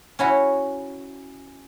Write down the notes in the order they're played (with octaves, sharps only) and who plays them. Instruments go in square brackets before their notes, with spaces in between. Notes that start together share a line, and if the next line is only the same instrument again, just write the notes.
[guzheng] C#4 E4 F#4